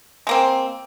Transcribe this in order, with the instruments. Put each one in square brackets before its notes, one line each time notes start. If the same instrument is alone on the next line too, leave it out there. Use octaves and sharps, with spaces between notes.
[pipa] G#3 A#3 C4